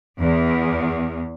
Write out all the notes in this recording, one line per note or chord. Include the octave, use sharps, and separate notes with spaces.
E2